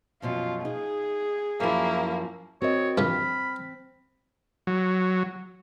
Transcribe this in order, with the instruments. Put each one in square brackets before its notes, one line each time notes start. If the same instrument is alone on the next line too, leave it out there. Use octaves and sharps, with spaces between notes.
[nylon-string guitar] F#2 B2 F3 [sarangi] F4
[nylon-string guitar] D#4 [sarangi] G#4
[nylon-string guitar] F#2 F3 [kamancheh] A#3 E4
[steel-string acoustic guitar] C4 [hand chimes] F#4 A#4 D#5 [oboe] C#5
[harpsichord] G2 D#3 F3 [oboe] B5 [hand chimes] F6
[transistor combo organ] F#3